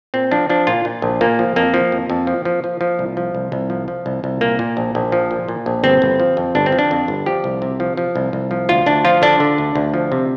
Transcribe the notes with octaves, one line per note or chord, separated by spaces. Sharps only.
A#2 C4
F3 D4
F3 D4
A#2 F4
A#2
A#1
A#2 A#3
F3
F2 A#3
F3
F2
F2
F3
F3
F3
F3
C2
F3
C2
C2
F3
F3
C2
C2
A#2 A#3
A#2
A#1
A#1
F3
A#2
A#2
A#1
G1 C4
G1
F3
F2
G1 D4
C4
F3
D4
F2
G1
F3 G4
C2
C3
F3
F3
C2
C2
F3
D2 F4
D2 D4
F3 F4
D3 D4
D3
D2
D2
F3
C3